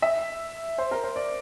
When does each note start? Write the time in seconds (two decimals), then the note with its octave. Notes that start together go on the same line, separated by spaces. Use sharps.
0.02 E5
0.78 C5
0.91 A#4
1.04 C5
1.16 D5